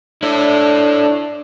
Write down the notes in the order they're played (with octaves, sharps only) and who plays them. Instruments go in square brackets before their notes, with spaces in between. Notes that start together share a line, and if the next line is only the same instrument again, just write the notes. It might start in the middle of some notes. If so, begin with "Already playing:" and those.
[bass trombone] D4 [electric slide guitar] E4 A4 C#5